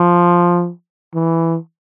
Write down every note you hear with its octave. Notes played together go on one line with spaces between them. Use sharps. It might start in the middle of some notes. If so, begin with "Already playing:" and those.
Already playing: F3
E3